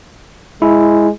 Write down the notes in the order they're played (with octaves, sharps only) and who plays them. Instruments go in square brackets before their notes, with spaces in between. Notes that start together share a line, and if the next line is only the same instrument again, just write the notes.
[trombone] G#3 [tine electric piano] E4